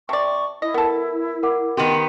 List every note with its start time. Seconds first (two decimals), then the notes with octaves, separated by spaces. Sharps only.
0.09 C3 D5 A5 C#6
0.62 E4 D#5
0.74 B3 A4 A#4
1.43 A#4 F#5 D6
1.77 D#3 B3 G4 A#4 C6